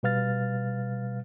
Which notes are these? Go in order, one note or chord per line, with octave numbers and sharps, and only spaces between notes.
B2 G3 B4 F5 F6 A6